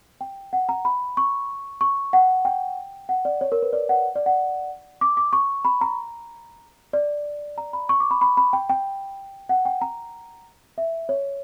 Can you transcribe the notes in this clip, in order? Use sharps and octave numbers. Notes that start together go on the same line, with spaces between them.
G5
F#5
A#5
B5
C#6
C#6
F#5
G5
F#5
D5
C#5
A#4
B4
D5
F#5
D5
F#5
D6
D6
C#6
B5
A#5
D5
A#5
B5
C#6
D6
B5
B5
B5
G5
G5
F#5
G5
A#5
E5
C#5